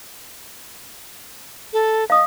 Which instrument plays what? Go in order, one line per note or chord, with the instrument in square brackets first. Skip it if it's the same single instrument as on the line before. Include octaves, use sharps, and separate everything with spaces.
[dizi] A4
[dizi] D#5 [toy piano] F5 D#6